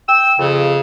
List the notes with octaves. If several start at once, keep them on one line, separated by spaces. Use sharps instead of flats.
G5 E6
F2 C#3